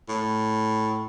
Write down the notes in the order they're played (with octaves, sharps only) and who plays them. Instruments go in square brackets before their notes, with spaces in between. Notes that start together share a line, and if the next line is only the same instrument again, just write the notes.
[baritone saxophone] A2